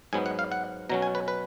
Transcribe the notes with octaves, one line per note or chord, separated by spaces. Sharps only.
G#2 F#3 B3 G#5
F#5
F5
F#5
B2 F#3 C#4 A#5
G#5
B4
B4